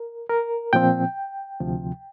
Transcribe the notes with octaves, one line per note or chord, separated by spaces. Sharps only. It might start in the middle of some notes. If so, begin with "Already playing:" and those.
Already playing: A#4
A#4
A#2 F3 C4 G5
D2 C3 F3